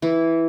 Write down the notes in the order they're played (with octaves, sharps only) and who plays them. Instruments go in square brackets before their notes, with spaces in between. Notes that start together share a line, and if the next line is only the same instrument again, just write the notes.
[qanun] E3 E4